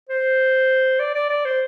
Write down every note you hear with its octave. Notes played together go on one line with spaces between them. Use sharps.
C5
D5
D5
D5
C5